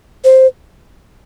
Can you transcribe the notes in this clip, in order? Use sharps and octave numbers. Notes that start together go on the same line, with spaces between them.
C5